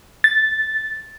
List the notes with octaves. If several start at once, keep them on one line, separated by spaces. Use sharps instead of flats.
A6